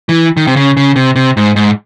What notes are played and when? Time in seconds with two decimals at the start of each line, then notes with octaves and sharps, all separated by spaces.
0.09 E3
0.37 D#3
0.47 C3
0.56 C#3
0.77 C#3
0.96 C3
1.16 C3
1.37 G#2
1.56 G#2